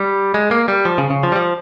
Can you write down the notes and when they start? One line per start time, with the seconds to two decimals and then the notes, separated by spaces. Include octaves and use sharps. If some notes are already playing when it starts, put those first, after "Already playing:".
Already playing: G3
0.34 G#3
0.51 A#3
0.68 G3
0.85 F3
0.98 C#3
1.10 C#3
1.23 F3
1.32 G3
1.36 F3